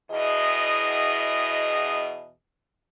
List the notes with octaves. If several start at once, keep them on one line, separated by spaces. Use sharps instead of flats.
E2 B2 E4 G#4 D#5